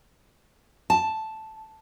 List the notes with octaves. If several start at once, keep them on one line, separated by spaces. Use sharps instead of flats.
A5